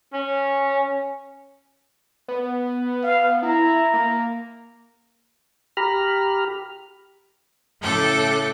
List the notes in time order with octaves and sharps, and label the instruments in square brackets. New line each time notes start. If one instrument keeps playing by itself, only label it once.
[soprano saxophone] C#4
[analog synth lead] B3
[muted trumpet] F5
[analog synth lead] E4 [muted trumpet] A#5
[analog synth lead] A#3
[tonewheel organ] G4 A#5 B5 F6
[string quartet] A2 C#3 A4 G5 D6 F#6